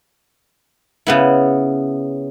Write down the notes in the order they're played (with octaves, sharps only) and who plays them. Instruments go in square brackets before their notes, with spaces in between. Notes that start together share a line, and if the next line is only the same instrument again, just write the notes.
[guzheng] C#3 B3 E4